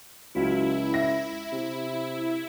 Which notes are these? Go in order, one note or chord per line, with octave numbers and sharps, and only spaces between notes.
C#2 F#3 E4 F4
E5 A#6
C3